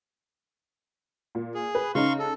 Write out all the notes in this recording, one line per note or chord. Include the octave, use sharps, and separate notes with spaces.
A#2
G#4
B4
C#3 D#4 F5 C6 C#6
A4